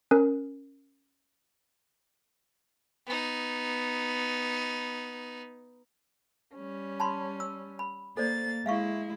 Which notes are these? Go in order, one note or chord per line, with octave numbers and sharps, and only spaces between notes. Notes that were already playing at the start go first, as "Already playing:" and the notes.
C#4 A#4
B3 D#4
G3 C#4
A5 B5 C6
E6
B5
A#3 A4 C5 D5 A6
G#3 E4 E5 F5 C#6